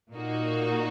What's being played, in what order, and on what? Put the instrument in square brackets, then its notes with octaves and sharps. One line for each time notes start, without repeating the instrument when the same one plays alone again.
[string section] A#2 A#3 D#4 F#4